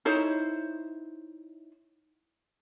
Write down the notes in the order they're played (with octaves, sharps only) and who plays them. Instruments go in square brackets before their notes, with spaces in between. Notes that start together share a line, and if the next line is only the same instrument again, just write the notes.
[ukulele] D#4 E4 C5 C#5